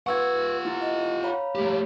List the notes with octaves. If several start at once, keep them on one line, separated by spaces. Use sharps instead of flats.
F4 B4 F#5 C#6 E6 G#6
B3 E4
D#5
C#5 F5 A#5 B5
A3 G4